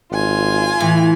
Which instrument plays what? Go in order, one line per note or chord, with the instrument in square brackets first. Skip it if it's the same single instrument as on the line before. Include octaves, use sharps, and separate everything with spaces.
[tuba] G#1 [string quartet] F4 G#5
[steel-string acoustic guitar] A2 [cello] E3